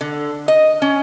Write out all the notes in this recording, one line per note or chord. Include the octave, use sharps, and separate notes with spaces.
D3
D#5
C#4